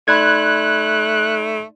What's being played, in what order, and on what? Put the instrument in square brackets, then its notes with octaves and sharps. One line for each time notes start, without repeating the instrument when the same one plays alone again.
[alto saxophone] A3 [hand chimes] D#4 D5 C6 [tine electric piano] B5 G#6 [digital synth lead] F#6